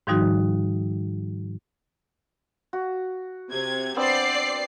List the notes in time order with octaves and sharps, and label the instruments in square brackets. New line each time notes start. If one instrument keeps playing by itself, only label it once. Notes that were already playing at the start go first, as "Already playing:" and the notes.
[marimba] G#2 D#3 F3 G3 D#4 F#4
[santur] F#4
[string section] C3 G#6
[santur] B3 C4 D4 [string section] C5 D5 C7